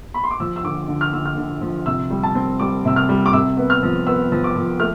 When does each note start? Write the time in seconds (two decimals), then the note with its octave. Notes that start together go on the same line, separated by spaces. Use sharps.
0.14 B5
0.24 C6
0.31 D6
0.40 F3 E6
0.56 E6
0.64 D3 D6
0.88 D3
1.01 F6
1.13 D3 E6
1.26 F6
1.38 D3
1.61 F3
1.86 C3 E6
2.10 G3
2.23 A5
2.35 C4
2.60 G3 D6
2.85 C3 E6
2.96 F6
3.09 G3
3.26 D6
3.33 C3 E6
3.57 B3
3.70 F6
3.83 F3
4.07 B3 E6
4.32 F3
4.44 D6
4.56 F3
4.80 A3 F6